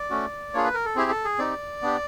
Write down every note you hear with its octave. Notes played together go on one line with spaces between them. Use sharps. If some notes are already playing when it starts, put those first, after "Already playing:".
Already playing: D5
A3 C#4 F#4
A#3 D4 F4 G#4 C#5
B4
A#4
A4
C4 E4 G4 G#4
A4
G#4
C4 D#4 G4 D5
B3 D4 G4